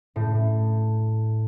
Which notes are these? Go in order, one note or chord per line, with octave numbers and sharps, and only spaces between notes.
A2